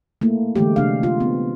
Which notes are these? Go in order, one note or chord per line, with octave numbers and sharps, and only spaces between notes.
A3 A#3 E4
D3 E3 G#3 A3 G4
C3 D4 F5
F4
B3 C4